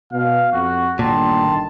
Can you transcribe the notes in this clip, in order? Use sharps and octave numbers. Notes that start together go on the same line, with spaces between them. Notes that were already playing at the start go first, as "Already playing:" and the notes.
B2 F5
F2 F#4
G1 A#2 D#3 A5 C6